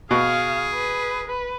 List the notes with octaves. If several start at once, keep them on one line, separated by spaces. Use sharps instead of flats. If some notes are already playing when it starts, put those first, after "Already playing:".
B2 G#4 F5
B4
B4